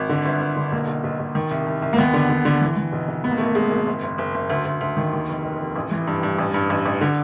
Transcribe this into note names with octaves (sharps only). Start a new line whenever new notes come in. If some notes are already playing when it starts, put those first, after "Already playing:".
Already playing: G#1
D3
G1
G1
D3
B1 A#3
B1
B1
B1
D#3
C2
C2
C2
A#3
D#2 B3
D3
D3
D3
E3
E3
B1
B1
G#1 B3
A#3
G#1 A3
A#3
G#1 G#3
G#1
F#1
F#1
F#1
F#1
D2
D2
D2
D#3
D#2
F1
F1
F1
A1
E3
G2
G2
A1
G2
A1
A1
D3